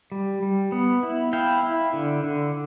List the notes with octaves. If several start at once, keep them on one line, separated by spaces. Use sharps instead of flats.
G3
G3
B3
E4
E4 F5 G5
E4
D3
D3